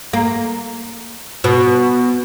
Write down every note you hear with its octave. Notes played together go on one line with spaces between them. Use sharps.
A#3
B2